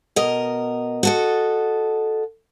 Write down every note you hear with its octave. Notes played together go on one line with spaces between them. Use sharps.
B2 A#4 D#5
F#4 A4 D#5